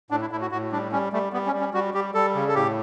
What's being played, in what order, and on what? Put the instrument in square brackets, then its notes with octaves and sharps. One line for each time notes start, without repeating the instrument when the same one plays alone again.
[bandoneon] A2 D4
E4
A2 E4
F#4
A2 F#4
G3 D4
G3 C#4
G3 A3
G3 B3
C#4
G3
C#4
G3 F#4
G3 G4
G3 A4
C#3
A4
A2 G4